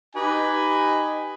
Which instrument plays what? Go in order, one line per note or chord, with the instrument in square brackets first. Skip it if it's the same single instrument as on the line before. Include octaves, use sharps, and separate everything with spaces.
[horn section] D#4 G4 B4 D#5 G#5